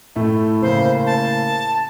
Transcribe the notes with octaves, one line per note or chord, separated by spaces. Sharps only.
A2 A3 E4
A2 C#3 A#3 C5
A5